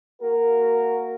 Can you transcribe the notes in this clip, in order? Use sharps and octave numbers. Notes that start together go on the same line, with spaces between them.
A#3 F#4 A#4